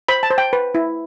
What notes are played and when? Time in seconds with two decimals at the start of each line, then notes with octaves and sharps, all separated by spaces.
0.08 C5 B5
0.23 A5
0.31 C5
0.38 G5
0.53 B4
0.75 E4